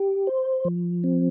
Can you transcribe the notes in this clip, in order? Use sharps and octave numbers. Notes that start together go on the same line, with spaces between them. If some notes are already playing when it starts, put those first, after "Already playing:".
Already playing: G4
C5
F3
C4